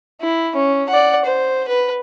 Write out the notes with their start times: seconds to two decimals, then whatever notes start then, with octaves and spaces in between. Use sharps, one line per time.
0.21 E4
0.55 C#4
0.89 D5 F#5
1.25 C5
1.68 B4